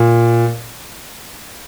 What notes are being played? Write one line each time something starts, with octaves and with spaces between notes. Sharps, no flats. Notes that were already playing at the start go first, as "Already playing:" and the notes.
Already playing: A#2